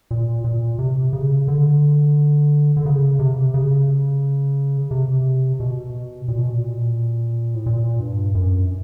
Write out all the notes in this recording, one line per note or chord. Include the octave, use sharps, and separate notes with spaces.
A#2
A#2
C3
C#3
D3
D3
C#3
C3
C#3
C3
B2
A#2
B2
A#2
A2
A#2
G2
F#2